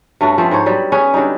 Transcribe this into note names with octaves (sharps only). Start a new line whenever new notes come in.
G2 A3 C#4 F#4
F3 A3 B3 C4
G#2 C5 C#5
F#3 G3 B3
B3 C#4 G#4 B4
D3 F#3 G3 D#4